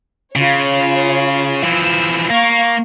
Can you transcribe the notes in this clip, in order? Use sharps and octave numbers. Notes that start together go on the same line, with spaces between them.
C#3 F4 C#5
E3 F3 E6
A#3 F5 C#6